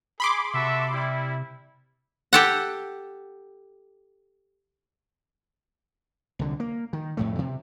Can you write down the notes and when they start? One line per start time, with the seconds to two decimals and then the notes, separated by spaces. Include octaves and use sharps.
0.20 G#4 B5 C6 D6
0.54 C3 F#4 A4 E5
0.93 G3 E4
2.33 G4 A4 F#5
6.39 C2 D3
6.60 A#3
6.93 D#3
7.17 F2 A2 A3
7.39 C3